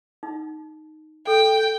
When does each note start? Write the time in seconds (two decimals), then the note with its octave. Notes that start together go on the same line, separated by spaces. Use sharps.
0.23 D#4
1.27 A4 G5